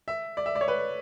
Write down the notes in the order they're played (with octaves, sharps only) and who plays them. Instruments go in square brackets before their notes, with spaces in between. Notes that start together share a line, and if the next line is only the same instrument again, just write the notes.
[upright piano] E5
D5
E5
D5
C#5
B4